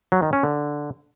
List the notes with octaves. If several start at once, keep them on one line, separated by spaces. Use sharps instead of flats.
F#3
D#3
C#4
D3